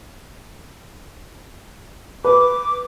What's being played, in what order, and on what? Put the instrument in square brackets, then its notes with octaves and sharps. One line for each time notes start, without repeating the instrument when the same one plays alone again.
[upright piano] B4 [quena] D6